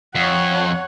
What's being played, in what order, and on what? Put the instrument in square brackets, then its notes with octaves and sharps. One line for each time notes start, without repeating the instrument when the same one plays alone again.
[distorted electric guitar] F2 [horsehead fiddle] C#5 F#5